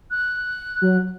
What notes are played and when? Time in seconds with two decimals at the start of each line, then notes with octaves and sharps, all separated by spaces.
0.11 F#6
0.82 F#3